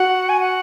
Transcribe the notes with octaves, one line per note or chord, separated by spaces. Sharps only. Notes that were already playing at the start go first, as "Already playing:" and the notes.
Already playing: F#4 F#5
G#5
F#5